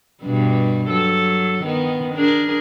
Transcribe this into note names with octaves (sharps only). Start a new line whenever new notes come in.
G2 B2 G3
F#3 A4
D#3 B3
D4 G#4 A#4